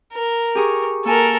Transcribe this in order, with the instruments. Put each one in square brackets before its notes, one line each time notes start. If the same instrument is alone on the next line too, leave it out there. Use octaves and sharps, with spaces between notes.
[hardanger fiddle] A#4
[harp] G4 G#4 C#6
[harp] A#3 G#5 [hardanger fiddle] A4 A#4